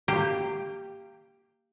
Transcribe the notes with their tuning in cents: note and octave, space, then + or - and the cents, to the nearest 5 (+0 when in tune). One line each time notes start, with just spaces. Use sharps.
A#3 -20 G4 +0